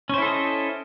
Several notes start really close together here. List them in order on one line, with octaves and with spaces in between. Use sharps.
C#4 C5 E4 A4 D#5